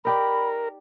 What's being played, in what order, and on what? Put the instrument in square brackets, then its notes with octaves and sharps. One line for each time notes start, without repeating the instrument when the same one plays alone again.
[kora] D#4 G4 D5 [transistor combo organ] A#4 [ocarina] B5